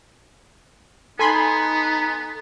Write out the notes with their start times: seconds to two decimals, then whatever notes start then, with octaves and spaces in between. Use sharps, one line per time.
1.19 B3 D#4 A4 G#5 B5 C6